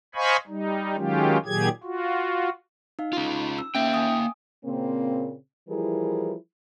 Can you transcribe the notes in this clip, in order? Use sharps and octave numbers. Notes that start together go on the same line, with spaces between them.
C5 D#5 F5 G#5 B5 C#6
G3 D#4
D#3 F#3 G#3 C#4 F4 G4
A#2 D#3 F#3 G4 G#4 G#6
F4 F#4
D#4 F5
C#4 F4
E6
A#3 C#4 E5 G5 G6
G#5 D#6
A#2 C#3 A#3 C4
E3 F3 G3 E4 G#4 A#4